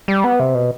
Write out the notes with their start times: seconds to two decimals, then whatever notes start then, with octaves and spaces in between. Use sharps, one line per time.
0.08 G3
0.24 B3
0.40 C3
0.55 B2